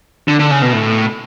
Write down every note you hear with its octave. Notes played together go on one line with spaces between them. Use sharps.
D3
D3
C#3
B2
A2